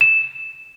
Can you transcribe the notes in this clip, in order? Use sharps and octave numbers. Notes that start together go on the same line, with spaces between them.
E7